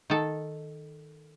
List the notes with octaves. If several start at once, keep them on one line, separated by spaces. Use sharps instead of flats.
D#3 A4